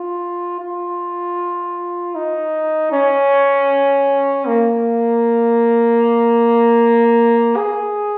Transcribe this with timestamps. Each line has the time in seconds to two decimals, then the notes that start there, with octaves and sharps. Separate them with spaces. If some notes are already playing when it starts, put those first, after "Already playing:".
Already playing: F4
0.59 F4
2.15 D#4
2.92 C#4
4.47 A#3
7.57 G#4